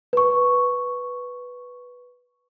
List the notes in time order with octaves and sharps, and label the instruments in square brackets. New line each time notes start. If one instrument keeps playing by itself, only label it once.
[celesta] B4 C#6